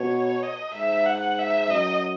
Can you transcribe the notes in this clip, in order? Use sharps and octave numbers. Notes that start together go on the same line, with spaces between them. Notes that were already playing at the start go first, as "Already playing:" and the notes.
Already playing: B2 C#5
D#5
G#2 E5
F#5
E5
F#2 D#5